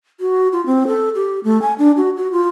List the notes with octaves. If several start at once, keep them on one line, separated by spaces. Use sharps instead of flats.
F#4
F4
C4
A4
G4
A3
G#5
D4
F#4
F#4
F4